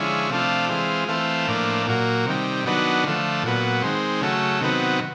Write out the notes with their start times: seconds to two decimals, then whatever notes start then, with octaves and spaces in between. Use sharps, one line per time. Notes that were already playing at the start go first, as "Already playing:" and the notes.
Already playing: D3 F3 G#3 C#4 E4
0.30 C3 F3 A3 D4 F4
0.69 E3 G#3 C4 F4
1.08 E3 A3 C4 F4
1.47 A2 F3 A#3 D4
1.87 A#2 F#3 A#3
2.26 C3 D#3 G3
2.65 D#3 F#3 B3 D4
3.04 D3 F3 A3
3.43 A#2 F#3 B3
3.82 D#3 G#3 C4
4.21 C#3 F#3 A3
4.61 C3 D#3 F#3 B3